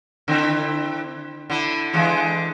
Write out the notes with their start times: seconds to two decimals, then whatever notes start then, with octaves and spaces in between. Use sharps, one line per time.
0.28 D3 C4 E4
1.50 D3 E4
1.93 D3 E3 G#3